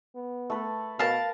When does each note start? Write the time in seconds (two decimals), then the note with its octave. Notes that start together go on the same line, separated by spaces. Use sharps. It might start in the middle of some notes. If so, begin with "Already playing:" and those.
0.15 B3
0.50 A3 A4 B4
0.99 B2 A#4 B4 F5 A5 A#5